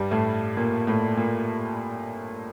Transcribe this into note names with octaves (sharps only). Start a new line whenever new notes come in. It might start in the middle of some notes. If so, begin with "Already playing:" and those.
Already playing: G2 G3
A2 A3
A#2 A#3
A2 A3
A#2 A#3